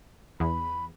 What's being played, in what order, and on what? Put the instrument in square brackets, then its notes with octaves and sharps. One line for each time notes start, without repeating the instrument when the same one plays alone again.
[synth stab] E2 [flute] B5